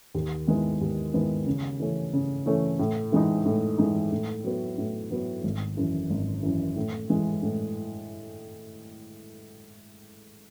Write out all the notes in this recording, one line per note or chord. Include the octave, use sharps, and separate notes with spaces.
D#2
D#3 G#3 B3 E4
D#2
D#3 G#3 B3 E4
C#3
E3 A3 C#4
C#3
E3 A3 C#4
A2
E3 G#3 D#4
A2
E3 G#3 D#4
A2
F#3 B3
A2
F#3 B3
G#1
F#2 E3
G#1
F#2 E3
A2
E3 G#3
A2